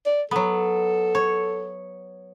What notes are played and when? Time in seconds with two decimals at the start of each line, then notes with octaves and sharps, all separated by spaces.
0.06 D5
0.31 F#3 B3 A4
1.15 C#5